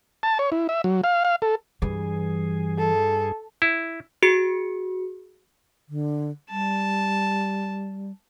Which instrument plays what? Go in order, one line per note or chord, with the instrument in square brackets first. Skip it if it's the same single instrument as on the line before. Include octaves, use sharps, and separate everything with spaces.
[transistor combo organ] A5
C#5
E4
E5
F#3
F5
F5
A4
[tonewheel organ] G2 G#4 [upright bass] E3 G3
[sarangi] A4
[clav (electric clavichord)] E4
[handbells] F#4 G#4 C#7
[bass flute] D3
[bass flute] G3 [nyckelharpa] A5